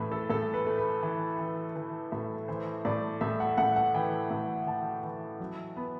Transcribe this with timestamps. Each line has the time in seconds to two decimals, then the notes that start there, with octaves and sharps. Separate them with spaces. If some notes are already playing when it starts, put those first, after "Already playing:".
Already playing: A2 E3 B4 E5
0.12 A4
0.30 A2 A4
0.54 B4
0.67 A3
0.78 B4
1.03 E3
1.39 E3
1.75 E3 B4
2.12 A2 E5
2.48 E3 C5
2.85 A2 D5
3.21 A2 E5
3.40 F#5
3.58 A2 F#5
3.76 F#5
3.94 E3 G5
4.30 A2
4.67 E3 A5
5.03 E3
5.40 F#3
5.76 B3